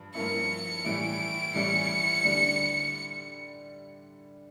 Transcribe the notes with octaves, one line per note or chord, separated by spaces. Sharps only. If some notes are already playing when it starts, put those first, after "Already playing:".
Already playing: G2 F3
G2 F3 A#3 C#4 E4 C#7
A2 E3 G3 C#4 E4 D7
A2 E3 G3 C#4 E4 C#7
D3 G3 D4